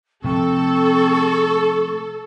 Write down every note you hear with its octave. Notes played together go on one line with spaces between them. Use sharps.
C3 F3 A3 C4 A4 C#6